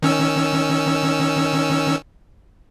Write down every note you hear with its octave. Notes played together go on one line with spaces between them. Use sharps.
D#3 C#4 E6